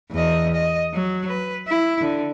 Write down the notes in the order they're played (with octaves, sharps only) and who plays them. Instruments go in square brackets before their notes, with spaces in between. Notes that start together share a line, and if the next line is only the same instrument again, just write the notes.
[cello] E2 D#5
D#5
F#3
B4
E4
D3